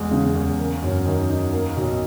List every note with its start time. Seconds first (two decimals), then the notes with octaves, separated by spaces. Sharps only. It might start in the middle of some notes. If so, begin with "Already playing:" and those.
Already playing: E2 G#3
0.11 C#3
0.35 E2
0.59 A#3
0.82 F#2
1.06 D#3
1.29 D#4
1.53 A#3
1.76 B1